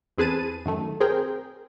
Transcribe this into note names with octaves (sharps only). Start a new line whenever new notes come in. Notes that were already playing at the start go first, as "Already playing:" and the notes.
E2 C4 G#4 B4 A5 D#7
F#2 D#3 A3
C4 G#4 A#4 G5